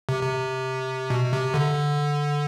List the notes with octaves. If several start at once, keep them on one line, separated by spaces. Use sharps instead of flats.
C3
C3
B2
C3
D3